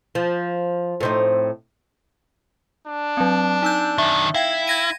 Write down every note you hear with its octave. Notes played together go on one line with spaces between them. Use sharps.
F3
A2 C4 D#4
D4
F#3 C4
D#4 E6 G6
F#2 D#3 E5
E4 F5 G5 G#6
G#6 A#6 D#7